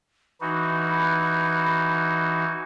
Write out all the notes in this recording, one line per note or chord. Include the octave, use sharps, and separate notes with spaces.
E3 D#4 F#4 B5